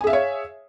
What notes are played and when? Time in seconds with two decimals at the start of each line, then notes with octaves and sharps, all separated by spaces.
0.01 G#5
0.04 G#4
0.07 E5
0.10 F5
0.13 C#5